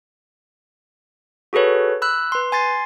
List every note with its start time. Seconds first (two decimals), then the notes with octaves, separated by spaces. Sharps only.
1.53 F#4 G#4 A4 B4 C#5
2.02 B5 E6 F#6
2.32 B4 C6
2.52 G#5 C6 A6 C7